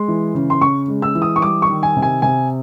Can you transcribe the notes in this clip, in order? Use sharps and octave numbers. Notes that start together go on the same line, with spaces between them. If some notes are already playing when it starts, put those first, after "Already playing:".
Already playing: G#3 C6
E3
C#3
C6
C#3 C#6
G#3
E6
E3
D#6
C#6
G3 D6
C#6
D#3
G#5
C3
G#5
C3 G#5